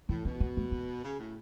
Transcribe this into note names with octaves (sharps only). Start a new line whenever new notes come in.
A2 E3
B2 C#4
B3
A3
B3
C#3
A2